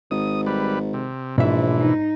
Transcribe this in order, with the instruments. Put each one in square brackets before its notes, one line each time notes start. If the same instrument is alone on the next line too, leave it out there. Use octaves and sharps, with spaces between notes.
[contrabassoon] G#1 [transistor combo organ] D#6
[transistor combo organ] G3 B4
C3
[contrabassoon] A#1 [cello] G#2 [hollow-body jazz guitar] B2 E5 [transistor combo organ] E3
[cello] D#4